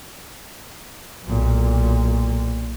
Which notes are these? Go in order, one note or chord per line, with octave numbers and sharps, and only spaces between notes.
B1 A#2